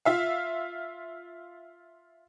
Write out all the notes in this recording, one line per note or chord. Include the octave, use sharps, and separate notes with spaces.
F4 E5 F5